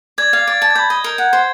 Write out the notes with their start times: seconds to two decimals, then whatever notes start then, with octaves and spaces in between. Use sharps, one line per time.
0.18 D5 G#6
0.33 F5
0.47 D5
0.62 A5
0.71 G#6
0.75 B5 G6
0.90 D#5
1.04 A#4
1.18 F#5
1.33 C5